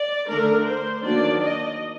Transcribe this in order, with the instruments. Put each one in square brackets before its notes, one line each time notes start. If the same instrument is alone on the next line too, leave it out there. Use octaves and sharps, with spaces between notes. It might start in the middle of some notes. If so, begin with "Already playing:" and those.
Already playing: [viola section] D5
D3 A3 D4 A#4
C5
D#3 F#3 A#3 D4 D5
D#5